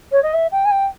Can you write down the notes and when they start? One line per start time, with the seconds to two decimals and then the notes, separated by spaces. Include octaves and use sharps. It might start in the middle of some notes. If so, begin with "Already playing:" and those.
0.11 C#5
0.23 D#5
0.33 E5
0.52 G5
0.65 G#5
0.71 G5